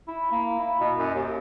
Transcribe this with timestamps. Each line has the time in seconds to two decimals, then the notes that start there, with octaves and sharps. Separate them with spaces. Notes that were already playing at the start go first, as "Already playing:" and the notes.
0.08 E4
0.32 A#3
0.60 E4
0.80 B2
0.97 F#2
1.15 D#2